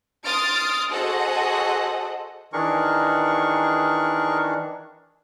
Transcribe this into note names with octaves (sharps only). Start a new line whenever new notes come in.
C6 D#6 F6 A6 D7
F#4 G#4 A4 C5 D#5 F#5
D#3 E3 D4 G#4 A#4 C#6